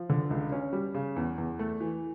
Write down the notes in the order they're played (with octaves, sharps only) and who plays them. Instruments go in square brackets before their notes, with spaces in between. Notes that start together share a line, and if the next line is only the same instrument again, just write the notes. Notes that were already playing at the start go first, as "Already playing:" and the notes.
Already playing: [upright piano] F3
D3
C#2
C#4
G3
C#3
E2
E2
A3
E3